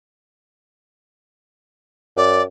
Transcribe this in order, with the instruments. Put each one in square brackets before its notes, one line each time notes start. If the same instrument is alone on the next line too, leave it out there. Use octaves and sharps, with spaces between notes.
[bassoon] F#2 [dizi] D5